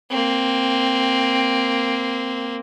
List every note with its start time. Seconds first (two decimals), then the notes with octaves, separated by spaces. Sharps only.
0.10 A#3 C4